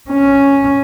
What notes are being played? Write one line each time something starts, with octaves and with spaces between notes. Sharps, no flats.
C#4